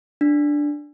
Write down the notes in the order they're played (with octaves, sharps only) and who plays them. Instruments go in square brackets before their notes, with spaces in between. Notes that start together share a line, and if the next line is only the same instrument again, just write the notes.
[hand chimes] D4